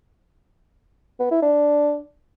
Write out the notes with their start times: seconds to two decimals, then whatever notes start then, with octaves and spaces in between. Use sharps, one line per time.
1.20 B3
1.31 E4
1.42 D4